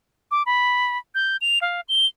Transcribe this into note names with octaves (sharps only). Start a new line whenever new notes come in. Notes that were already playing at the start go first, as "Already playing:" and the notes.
D6
B5
G6
F7
F5
G7